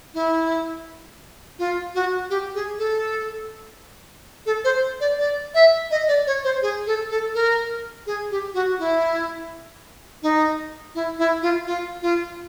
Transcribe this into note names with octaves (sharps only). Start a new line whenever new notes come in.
E4
F4
F#4
G4
G#4
A4
A4
C5
D5
D5
E5
D#5
D5
C#5
C5
G#4
A4
A4
A#4
G#4
G4
F#4
E4
D#4
E4
E4
F4
F4
F4